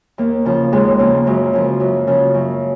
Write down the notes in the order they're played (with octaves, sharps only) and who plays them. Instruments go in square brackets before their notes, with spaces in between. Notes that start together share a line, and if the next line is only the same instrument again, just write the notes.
[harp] D#2 A#3
C#3 F3
D#2 G#3
C#3 F3 A#3
F#2 G#3
C#3 F3
F#2
C#3 F3
F#2